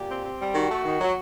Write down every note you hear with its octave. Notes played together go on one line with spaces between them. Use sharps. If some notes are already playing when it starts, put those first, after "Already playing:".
Already playing: A#2 G4
C4
C4
G3
D#3 F#4
A3
D#3
F#3